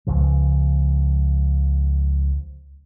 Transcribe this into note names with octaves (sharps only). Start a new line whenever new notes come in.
C#2 C#3 F3